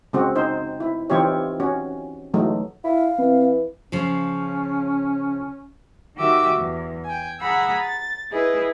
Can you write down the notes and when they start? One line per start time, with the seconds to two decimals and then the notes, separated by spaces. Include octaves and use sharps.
0.13 C#3 G#3 C4 F#4
0.36 D#4 C5
0.80 E4
1.10 E3 C4 D#4 F4 G4 C#5
1.60 C#4 F#4
2.34 E3 F#3 G#3 A3 D#4
2.84 E4 F5
3.19 E3 C4
3.92 C#3 F3 C#4
6.16 D#3 F#4 G4 E5 D6 E6
6.55 E2
7.05 G5 G#5
7.41 G#4 F#5 A#5 B5 E6
7.83 A6
8.31 E4 G#4 B4 D#5